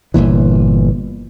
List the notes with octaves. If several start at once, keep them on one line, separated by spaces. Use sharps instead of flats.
G1 C#2 A#2 E3